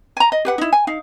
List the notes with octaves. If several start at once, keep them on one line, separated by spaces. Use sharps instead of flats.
G#5 A#5
D#5
G4 B4 F#5
D#4 E4
G#5
D#4 F5